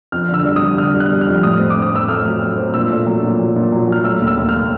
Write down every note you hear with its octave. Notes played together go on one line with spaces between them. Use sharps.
F2 F6
D3
E6
G3
D#6
G3
D3 F6
G3
F#6
G3
F6
F2
A2 D#6
C4
D6
C4
D#6
C4 E6
A3 F6
F#3
F#3
C4
A#2 E6
A3
F#3
A#2
F#3
A#2
F#3
F#3 F6
A3 E6
D#2
E6
D#2
A3 F6